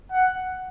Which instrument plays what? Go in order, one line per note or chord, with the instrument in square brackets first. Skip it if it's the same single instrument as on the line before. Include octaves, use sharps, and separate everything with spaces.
[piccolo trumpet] F#5